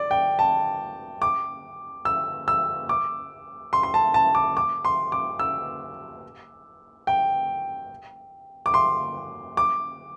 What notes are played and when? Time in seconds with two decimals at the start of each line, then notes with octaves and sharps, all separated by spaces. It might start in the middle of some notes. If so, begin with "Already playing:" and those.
Already playing: D5
0.11 G5
0.39 A5
1.22 D6
2.05 E6
2.48 E6
2.89 D6
3.73 C6
3.83 C6
3.94 A5
4.14 A5
4.35 D6
4.57 D6
4.85 C6
5.12 D6
5.39 E6
7.07 G5
8.66 D6
8.74 C6
9.57 D6